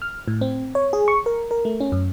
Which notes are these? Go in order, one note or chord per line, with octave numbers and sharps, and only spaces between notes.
F6
A2
C4
C#5
G#4
C#6
A#4
A#4
A3
C#4
F#2